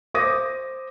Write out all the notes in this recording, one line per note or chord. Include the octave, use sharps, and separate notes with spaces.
C5 D6 D#6 A#6 D#7